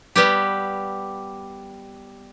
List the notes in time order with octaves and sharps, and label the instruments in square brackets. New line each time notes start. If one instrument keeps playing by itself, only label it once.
[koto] G3 B3 G4